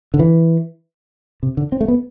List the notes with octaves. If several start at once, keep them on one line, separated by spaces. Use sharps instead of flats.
D3
E3
C3
D3
C4
A3
B3